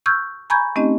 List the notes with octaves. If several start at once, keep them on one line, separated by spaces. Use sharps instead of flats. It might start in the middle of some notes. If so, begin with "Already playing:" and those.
C#6 E6 F6 G6 G#6
G#5 A#5 B5 C#6 G6 G#6
A3 C4 C#4 D#4 G4 D#5